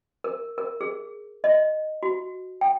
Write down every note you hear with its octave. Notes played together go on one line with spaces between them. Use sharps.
A#4
A#4
G#4
D#5
F#4
G5